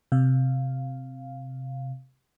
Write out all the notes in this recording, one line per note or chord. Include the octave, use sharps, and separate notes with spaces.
C3 F5